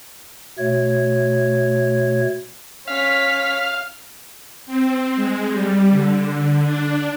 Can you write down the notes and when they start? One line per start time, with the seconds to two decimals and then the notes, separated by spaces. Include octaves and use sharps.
0.59 B2 A3 C#5
2.88 C#4 F5 B6
4.66 C4
5.16 G#3
5.51 G3
5.91 D3
6.64 D4